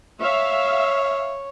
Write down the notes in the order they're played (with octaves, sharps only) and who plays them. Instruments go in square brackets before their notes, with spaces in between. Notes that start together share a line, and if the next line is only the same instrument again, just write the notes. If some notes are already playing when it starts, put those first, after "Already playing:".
[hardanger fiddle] C#5 [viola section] E5 F5